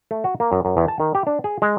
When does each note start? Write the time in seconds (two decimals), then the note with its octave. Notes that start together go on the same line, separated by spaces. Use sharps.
0.11 A3
0.24 F#4
0.40 A#3
0.52 F#2
0.65 F#2
0.77 E2
0.88 A5
1.00 D#3
1.15 G4
1.27 D4
1.44 G#4
1.62 G#3